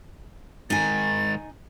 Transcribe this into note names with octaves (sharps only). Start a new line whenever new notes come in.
G#2 D#3 D#4 G#5 A6